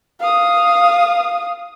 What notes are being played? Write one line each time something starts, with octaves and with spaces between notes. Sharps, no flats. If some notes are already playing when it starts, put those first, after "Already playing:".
F5 D#6